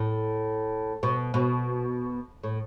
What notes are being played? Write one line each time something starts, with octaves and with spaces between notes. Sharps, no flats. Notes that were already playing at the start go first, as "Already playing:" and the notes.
Already playing: A2
B2
B2
A2